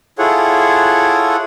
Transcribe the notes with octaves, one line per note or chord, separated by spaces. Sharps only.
E4 F4 G#4 A4 C#5 F#5